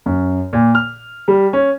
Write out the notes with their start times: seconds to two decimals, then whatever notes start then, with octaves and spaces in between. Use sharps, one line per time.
0.06 F#2
0.53 A#2
0.75 F6
1.28 G3
1.53 C#4